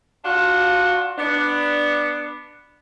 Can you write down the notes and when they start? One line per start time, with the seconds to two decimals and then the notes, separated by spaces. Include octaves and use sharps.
0.24 D4 F4 F#4
1.18 B3 D4